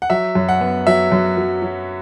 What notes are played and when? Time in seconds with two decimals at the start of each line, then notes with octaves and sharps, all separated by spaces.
0.02 F#5
0.10 F#3 E5
0.35 F#2
0.49 F#5
0.61 B3
0.87 F#3 E5
1.12 F#2
1.37 F#3
1.62 F#3